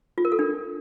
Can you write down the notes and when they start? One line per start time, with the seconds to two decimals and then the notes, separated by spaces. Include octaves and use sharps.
0.18 F4
0.25 A#4
0.32 A4
0.39 D4